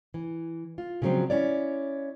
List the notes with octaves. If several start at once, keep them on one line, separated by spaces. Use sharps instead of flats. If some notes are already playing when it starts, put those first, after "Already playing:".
E3
F4
C#3 F3 F#3 B3 C4 D4
C#4 E4 C#5 D5